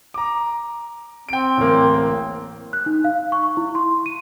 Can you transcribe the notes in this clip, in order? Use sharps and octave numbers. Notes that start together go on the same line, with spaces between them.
A#5 D6
C4 G5 D7
D1 A1 A#3
F#6
D#4
F5
C#6
E4
C6
D#7